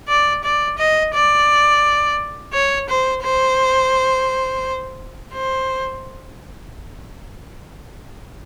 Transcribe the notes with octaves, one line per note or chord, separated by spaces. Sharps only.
D5
D5
D#5
D5
C#5
C5
C5
C5